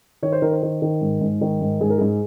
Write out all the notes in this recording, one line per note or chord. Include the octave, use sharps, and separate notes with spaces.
D#3 C#5
C5
D#3 A#4
C5
D#3
D#3
G#2
G#2
D#3
G#2
G#2 G#4
A#4
G#2 G#4